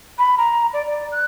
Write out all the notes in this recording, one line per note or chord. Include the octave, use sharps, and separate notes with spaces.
B5
A#5
D5
D5
F#6